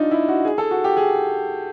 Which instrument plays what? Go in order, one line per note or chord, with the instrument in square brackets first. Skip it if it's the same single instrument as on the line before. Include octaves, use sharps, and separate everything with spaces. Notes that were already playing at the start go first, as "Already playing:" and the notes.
Already playing: [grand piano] D4 D#4 F4
E4
F#4
G#4
A4
F#4
G4
G#4